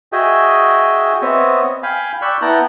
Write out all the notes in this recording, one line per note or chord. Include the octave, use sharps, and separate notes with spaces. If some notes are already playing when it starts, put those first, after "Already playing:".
F#4 G#4 D#5 E5 G5 G#5
B3 C4 C#5 D#5 E5
F5 G5 G#5 B5
D5 G5 B5 C#6 E6 F#6
B3 E4 G5 A5 A#5 F#6